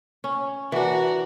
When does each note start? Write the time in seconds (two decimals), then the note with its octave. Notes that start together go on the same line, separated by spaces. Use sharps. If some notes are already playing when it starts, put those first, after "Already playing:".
0.24 C#4
0.72 E3 D4 F#4 A#4